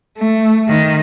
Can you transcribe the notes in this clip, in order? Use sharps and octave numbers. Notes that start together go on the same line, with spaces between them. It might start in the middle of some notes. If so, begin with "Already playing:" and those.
A3
D#3